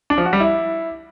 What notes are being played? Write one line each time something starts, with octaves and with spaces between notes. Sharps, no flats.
D4
F3
F#4
G3
E4